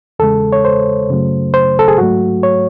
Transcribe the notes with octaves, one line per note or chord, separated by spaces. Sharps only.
E2 C#3 G#3 A4
C#5
C5
F#2 C#3 F#3 A3
C5
A4
G#4
G#2 F#3 A3 F#4
C#5